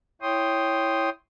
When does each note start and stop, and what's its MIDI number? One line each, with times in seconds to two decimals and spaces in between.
0.22 1.09 64
0.22 1.09 73
0.22 1.09 79
0.22 1.09 84
0.22 1.09 87